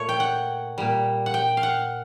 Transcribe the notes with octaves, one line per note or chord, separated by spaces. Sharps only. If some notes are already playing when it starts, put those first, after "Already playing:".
Already playing: A#2 A3 C#5
G5
F#5
A#2 G3
F#5
G5
F5
F#5